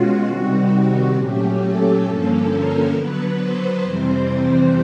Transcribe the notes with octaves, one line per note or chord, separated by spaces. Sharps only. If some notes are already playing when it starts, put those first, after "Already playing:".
Already playing: B2 G#3 C#4 F4 F#4
C3 D#3 G3 C4
A#2 F#3 A3 C#4 G4
A4
G2 D3 F3 A#3 C#4
A#4
D3 F#3 B3 B4
C5
F2 C3 E3 G3 C4 C5
C5